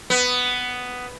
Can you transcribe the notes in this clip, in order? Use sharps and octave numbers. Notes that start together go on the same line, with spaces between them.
B3